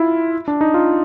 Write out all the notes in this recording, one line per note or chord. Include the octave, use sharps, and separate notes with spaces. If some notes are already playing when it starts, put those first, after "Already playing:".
Already playing: E4 F4
D4
D#4
F4